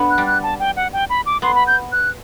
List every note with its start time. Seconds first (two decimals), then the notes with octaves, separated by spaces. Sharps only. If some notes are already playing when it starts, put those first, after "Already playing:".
Already playing: B3 D4
0.10 F#6
0.18 G3
0.27 F#6
0.43 A5
0.60 G5
0.76 F#5
0.93 G5
1.10 B5
1.26 D6
1.42 B3 C6
1.55 B5
1.67 G6
1.92 F#6